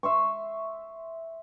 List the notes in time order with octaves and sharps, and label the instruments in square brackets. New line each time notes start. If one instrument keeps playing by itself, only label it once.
[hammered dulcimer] E5 C6 C#6